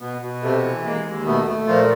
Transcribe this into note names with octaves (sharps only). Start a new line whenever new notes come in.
B2 B3
B2
C3 A3
E3
G#3 A#3
D#2
B2 A3 B3
A3
A#2 F3 F4